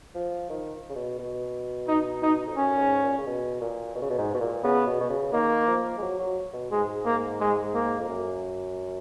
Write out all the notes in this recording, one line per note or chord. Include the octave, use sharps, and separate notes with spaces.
F3
D#3
C#3
B2
B2
D#4
D#4
F2
F#2 C#4
A#2
G#2
A#2
C#3
B2
A#2
B2
C#3
B2
G#2
B2
A#2
C#3 B3
B2
B2
C#3
D#3 A#3
F3
G#3
F#3
F#3
B2
G#2 G#3
A#3
G#3
A#3
F2
F#2